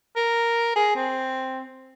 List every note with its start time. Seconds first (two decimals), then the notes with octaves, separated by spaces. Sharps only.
0.16 A#4
0.76 G#4
0.96 C4